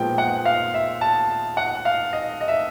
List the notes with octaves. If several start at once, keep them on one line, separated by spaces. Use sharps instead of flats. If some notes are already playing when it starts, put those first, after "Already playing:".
Already playing: A#2 F3 G#3 B3 G5
F#5
F5
E5
A5
F#5
F5
D#5
D#5
E5